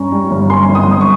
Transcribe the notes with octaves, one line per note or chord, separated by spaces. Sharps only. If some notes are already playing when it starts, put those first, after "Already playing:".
Already playing: G2 C#4 A#5 C#6
G3
G1
G2 G#5 C6
G1
C6 D#6
G2 D#6
C#6